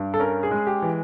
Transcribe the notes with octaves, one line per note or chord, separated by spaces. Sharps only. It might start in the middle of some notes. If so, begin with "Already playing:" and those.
Already playing: G2
A4
C#4 A#4
G#4
G#3
G4
E3